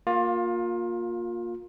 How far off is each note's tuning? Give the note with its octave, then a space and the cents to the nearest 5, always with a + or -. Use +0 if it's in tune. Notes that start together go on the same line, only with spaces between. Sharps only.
A#3 +0 F4 +25